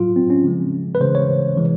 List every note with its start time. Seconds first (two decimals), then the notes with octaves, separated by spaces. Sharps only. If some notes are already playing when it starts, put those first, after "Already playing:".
Already playing: A2 F#3 F4
0.16 C4
0.30 C#4
0.44 C#3 F3 G#3
0.95 B4
1.00 C#3 E3 G#3 C5
1.15 C#5
1.57 C3 E3 G#3